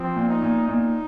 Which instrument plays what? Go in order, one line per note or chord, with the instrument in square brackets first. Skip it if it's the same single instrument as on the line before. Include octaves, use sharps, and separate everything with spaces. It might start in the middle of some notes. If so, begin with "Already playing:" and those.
Already playing: [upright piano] F3 [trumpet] C4
[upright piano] A#2
[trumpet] D#4
[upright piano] A#2
[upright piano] A#2 [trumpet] D#4